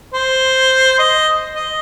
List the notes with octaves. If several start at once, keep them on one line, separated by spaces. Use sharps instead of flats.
C5
D#5
D#5